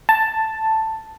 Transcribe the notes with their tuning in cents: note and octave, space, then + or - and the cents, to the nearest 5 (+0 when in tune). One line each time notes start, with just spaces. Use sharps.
A5 +5